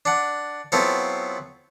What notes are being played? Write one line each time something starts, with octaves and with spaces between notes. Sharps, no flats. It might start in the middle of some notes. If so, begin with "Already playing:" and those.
D4 F#5
F#3 B3 C4 E4 F4 A4